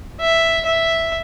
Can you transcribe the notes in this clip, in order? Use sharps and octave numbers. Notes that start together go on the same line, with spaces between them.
E5
E5